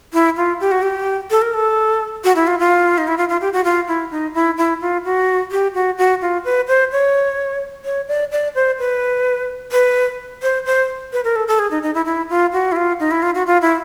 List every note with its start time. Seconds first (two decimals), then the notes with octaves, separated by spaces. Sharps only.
0.13 E4
0.37 F4
0.60 G4
0.71 F#4
0.82 G4
1.31 A4
1.42 A#4
1.54 A4
2.24 F#4
2.36 E4
2.47 F4
2.59 F4
2.98 D#4
3.07 E4
3.17 F4
3.29 F4
3.41 G4
3.53 F#4
3.64 F4
3.88 E4
4.11 D#4
4.34 E4
4.57 E4
4.81 F4
5.05 F#4
5.51 G4
5.74 F#4
5.98 F#4
6.22 F4
6.44 B4
6.68 C5
6.92 C#5
7.85 C#5
8.08 D5
8.32 D5
8.55 C5
8.79 B4
9.72 B4
10.42 C5
10.66 C5
11.13 B4
11.24 A#4
11.36 A4
11.48 A4
11.59 G#4
11.71 D#4
11.83 D#4
11.94 E4
12.06 E4
12.30 F4
12.53 F#4
12.72 E4
12.76 F4
13.00 D#4
13.11 E4
13.22 F4
13.35 F#4
13.47 F4
13.61 E4